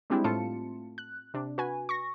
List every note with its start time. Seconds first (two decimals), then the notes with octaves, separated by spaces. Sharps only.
0.10 G3 G#3 C4 D4 E4 G4
0.24 A2 A3 C4 F4 A5 C#7
0.98 F#6
1.34 C3 D4
1.58 F#4 B4 G#5
1.89 C#6 A#6